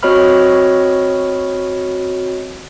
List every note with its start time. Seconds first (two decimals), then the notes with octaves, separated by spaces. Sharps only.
0.03 C4 F#4 C#5 D#5 B5 F6